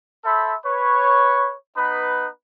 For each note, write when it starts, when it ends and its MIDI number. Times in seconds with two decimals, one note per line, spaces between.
0.25 0.55 69
0.25 0.55 72
0.25 0.55 76
0.25 0.55 83
0.64 1.54 71
0.64 1.54 73
1.76 2.27 59
1.76 2.27 63
1.76 2.27 71